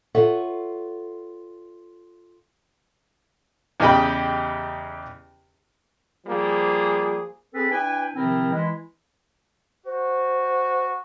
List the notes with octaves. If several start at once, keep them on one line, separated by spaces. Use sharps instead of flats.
F4 A4 B4 C#5 E5 F#5
E2 C#3 G4 D#5 G5 B5
F3 G3 A#3 G#4
C4 G#4 A4 B4
D4 E4 B4 G5 G#5
C3 D#3 F3 C4 E4 A#4
E3 G#3 E4
F#4 C5